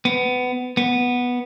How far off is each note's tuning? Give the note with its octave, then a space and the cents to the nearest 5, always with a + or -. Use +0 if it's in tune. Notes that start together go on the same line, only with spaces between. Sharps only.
B3 +20
B3 -5